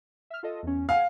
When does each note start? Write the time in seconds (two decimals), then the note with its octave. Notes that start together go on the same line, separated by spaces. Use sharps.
0.30 E5 F6
0.43 F4 A4 D#5
0.63 E2 C#4
0.89 F5 F#5 G#5 F6